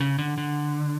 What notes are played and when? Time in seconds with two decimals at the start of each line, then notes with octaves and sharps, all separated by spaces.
0.01 C#3
0.18 D3
0.38 D3